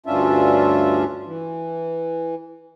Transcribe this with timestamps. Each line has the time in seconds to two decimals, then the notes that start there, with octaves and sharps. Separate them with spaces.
0.06 D2 G2 C#4 D4 F4 E5
1.27 E3